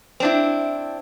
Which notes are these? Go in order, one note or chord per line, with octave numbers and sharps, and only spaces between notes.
C4 D4 E4